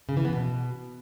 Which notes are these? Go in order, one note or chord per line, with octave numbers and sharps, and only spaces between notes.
C#3
E3
B3
B2